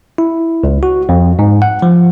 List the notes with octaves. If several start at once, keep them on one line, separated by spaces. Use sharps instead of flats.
E4
C#2
F#4
F2
G#2
F#5
F3